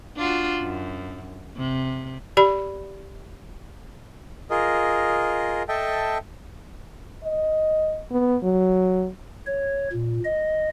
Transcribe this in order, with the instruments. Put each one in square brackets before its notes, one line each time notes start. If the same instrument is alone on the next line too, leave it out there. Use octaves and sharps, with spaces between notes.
[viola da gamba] D4 F4 F#4
F#2
C3
[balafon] G4 D5 B5
[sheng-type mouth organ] F4 G#4 A#4 D#5
A4 D#5 E5 G5 A5
[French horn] D#5
B3
F#3
[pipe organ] C#5
A#2
D#5